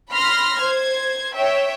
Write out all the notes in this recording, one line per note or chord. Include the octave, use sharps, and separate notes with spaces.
B5 C6 F6 A#6
C5 G#6
C#5 E5 G5